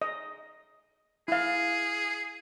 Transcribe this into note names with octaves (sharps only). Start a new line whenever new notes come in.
D#5
E4 G#4 F5